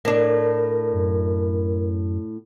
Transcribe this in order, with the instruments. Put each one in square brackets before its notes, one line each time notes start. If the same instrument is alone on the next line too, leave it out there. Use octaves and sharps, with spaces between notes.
[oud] A2 D4 [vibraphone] A#4
[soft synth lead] F#2